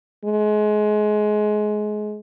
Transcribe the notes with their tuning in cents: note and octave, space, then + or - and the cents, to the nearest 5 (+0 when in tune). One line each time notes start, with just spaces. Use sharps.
G#3 +25